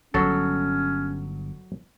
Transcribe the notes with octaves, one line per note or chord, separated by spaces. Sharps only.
G1 F#3 C#4 A4